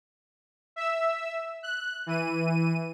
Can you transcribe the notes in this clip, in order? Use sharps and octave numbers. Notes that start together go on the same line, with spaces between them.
E5 E6
F#6
E3 D#7